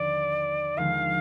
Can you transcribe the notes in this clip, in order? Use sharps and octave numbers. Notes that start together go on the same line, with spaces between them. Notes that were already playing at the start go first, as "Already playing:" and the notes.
Already playing: D#2 D3 F3 D5
D#2 D3 F3 G#3 F5